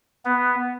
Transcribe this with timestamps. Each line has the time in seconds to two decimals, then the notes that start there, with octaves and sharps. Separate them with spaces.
0.25 B3